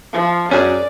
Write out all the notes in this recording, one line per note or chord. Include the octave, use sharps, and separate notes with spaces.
F3
F#2 C#4 G#4 D5